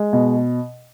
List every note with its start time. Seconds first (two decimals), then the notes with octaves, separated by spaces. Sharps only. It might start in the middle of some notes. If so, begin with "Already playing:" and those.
Already playing: G#3
0.13 B2